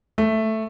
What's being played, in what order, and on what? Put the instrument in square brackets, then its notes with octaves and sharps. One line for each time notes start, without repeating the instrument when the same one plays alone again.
[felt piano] A3